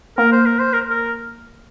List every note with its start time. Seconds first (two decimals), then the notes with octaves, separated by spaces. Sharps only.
0.18 A#3 A#4
0.32 C5
0.46 A#4
0.59 C5
0.73 A#4
0.90 A#4